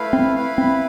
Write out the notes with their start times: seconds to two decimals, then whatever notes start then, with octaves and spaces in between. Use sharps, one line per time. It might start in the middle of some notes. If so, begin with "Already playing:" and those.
Already playing: A3 E4 B4 F5
0.13 C4
0.35 E4 B4 F5
0.58 C4